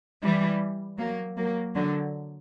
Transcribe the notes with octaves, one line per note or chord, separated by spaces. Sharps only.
E3 G3
F#3 A#3
F#3 A#3
D3 F#3